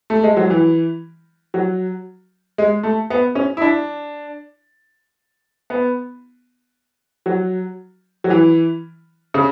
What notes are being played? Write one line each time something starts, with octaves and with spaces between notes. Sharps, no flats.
A3
G#3
F#3
E3
F#3
G#3
A3
B3
C#4
E4
D4
B3
F#3
F#3
E3
C#3